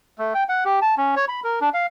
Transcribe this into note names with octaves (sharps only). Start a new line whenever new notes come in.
A3
G5
F#5
G4
A5
C#4
C#5
B5
A#4
D4
F5